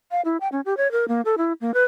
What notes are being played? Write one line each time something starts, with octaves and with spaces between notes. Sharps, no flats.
F5
E4
G5
C#4
G4
C#5
A#4
A#3
A4
E4
A#3
B4